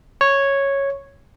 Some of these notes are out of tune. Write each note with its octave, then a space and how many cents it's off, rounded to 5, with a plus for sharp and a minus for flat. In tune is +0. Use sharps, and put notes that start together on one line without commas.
C#5 -5